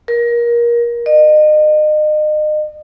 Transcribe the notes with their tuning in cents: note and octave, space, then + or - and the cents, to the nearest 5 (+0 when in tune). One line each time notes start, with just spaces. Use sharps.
A#4 +25
D#5 -35